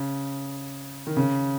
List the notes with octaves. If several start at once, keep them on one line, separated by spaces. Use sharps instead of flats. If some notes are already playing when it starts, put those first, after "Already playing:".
Already playing: C#3
D#3
C#3